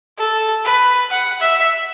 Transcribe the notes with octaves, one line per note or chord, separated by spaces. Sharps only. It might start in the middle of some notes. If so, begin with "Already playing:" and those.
A4
B4
F#5
E5